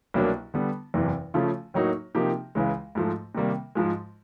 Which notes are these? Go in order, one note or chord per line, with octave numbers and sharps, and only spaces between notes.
C2 B2 F#3 A#3 D4
D3 G3 B3
F#1 E2 C3 E3
C#3 F3 A3 C#4 F4
A2 F#3 A#3 D#4 F#4
C3 F3 A#3 D#4 G4
C#2 C#3 E3 G#3
G#2 F3 A3
C3 D#3 G3 A#3
G#2 F3 G#3